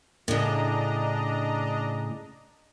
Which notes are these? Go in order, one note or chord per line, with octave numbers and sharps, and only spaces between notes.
A2 C#3 D4 D#5 A#5